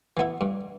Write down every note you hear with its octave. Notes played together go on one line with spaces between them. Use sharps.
E3 B3 E4
G2